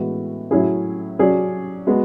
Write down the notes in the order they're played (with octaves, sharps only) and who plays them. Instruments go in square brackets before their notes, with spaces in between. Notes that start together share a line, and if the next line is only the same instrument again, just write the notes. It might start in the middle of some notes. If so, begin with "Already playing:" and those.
Already playing: [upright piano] A2 E3 G#3 B3 F#4
A2 F#3 C#4 E4 G#4
F#3 C#4 G#4 D5
G#3 B3 F#4